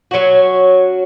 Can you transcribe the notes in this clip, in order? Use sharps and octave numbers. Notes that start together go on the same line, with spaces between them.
F#3 C#4 F#4